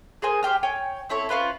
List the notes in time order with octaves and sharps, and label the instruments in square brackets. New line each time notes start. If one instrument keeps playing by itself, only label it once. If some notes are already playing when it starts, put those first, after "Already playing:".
[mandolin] G#4 A#4 C5 G#5
G4 C5 G5 F6
C#5 G5 G#5
C4 E4 A4 C#5
C#4 F4 B4 C5